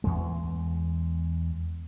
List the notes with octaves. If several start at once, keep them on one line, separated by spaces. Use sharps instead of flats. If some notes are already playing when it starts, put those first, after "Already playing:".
E2 G#3